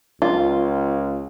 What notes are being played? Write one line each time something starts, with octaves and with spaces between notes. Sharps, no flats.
C#2 F4